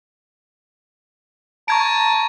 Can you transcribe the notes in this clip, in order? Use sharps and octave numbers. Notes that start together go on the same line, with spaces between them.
A5 A#5 C#6 G#6 D7